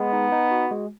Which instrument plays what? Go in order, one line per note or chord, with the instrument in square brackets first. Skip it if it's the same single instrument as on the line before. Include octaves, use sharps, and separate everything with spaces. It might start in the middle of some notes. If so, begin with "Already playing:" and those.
Already playing: [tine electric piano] G#3 [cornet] B3
[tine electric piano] D#4
D#4
F#4
G#3